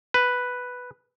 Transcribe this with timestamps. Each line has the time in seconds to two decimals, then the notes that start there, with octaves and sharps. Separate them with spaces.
0.14 B4